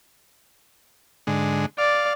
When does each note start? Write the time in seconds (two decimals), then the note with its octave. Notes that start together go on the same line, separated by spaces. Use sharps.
1.27 G#2 D3 G#3
1.78 D5 F5